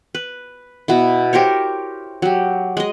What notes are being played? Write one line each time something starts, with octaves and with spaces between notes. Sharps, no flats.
B4
B2 B3 E4
G4 A#4 C5 C#5
F#3 G4
G#3 D#5